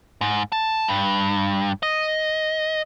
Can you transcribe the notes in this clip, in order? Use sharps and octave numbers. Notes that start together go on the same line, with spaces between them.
G#2
A5
G2
D#5